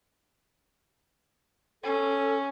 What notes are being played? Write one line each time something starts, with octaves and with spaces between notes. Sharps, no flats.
C#4 A4